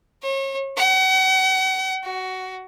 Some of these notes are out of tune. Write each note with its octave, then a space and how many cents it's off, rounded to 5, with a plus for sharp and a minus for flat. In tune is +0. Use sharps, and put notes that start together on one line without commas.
C#5 -35
F#5 +40
F#4 +15